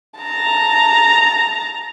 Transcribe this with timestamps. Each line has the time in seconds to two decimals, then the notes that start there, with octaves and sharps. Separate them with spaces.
0.20 A5 A#5